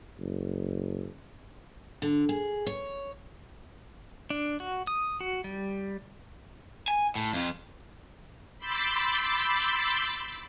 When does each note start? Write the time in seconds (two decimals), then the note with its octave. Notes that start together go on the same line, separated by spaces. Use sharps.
0.19 F#1
2.02 D3
2.29 G#4
2.67 C#5
4.30 D4
4.60 F#4
4.87 D#6
5.21 F#4
5.44 G3
6.88 G#5
7.15 A2
7.33 F2 F4
8.58 B5 C6 D6 E6 G6 A6